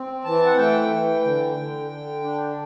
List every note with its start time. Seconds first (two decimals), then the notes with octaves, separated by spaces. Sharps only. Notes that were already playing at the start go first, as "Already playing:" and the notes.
Already playing: C4
0.24 E3 A5
0.46 F#5
0.57 A3 G5
0.91 E3
1.24 D3
1.57 D3
1.91 D3
2.24 D4